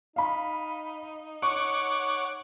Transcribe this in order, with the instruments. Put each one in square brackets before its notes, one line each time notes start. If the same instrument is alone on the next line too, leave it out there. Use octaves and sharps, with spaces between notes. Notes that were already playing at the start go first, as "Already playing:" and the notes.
[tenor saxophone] D#4 [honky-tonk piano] F5 B5
[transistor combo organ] C#5 F#5 D6 [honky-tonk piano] C#6